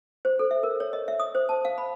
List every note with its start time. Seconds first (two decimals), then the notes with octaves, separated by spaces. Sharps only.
0.25 C5
0.39 A4
0.51 E5
0.63 A#4
0.80 C#5
0.93 D#5
1.08 E5
1.20 D#6
1.35 C5
1.49 A5
1.65 F5
1.78 B5